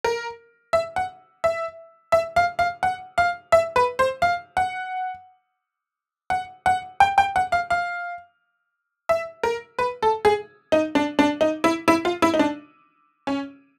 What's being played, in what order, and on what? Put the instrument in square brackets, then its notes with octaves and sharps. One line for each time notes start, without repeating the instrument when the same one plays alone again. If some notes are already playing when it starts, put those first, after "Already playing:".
[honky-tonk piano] A#4
E5
F#5
E5
E5
F5
F5
F#5
F5
E5
B4
C5
F5
F#5
F#5
F#5
G5
G5
F#5
F5
F5
E5
A#4
B4
A4
G#4
D#4
D4
D4
D#4
E4
E4
F4
E4
D#4
D4
C#4